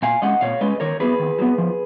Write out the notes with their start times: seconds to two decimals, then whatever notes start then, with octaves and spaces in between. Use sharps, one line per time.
0.02 A#2 F5 G#5
0.22 G#3 C#4 D#5 F#5
0.41 A#2 C#5 F5
0.61 G#3 C#4 B4 D#5
0.80 D#3 A#4 C#5
1.00 F#3 B3 G#4 B4
1.19 D#3
1.38 F#3 B3
1.58 F3